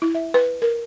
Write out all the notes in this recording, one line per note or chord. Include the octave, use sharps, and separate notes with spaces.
E4
E5
B4
A#4